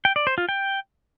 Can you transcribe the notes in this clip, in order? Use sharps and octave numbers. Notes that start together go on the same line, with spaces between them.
G5
D5
C5
F4
G5